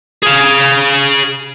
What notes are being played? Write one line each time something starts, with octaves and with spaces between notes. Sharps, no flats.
G#4 F5